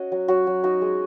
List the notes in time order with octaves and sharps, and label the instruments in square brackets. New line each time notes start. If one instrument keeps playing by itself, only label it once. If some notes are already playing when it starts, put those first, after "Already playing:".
Already playing: [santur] C#4 F#4 D#5
F#3
F#3 F#4
F#3
D#4 F#4
G#3